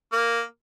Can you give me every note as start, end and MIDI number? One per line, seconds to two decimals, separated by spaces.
0.12 0.41 58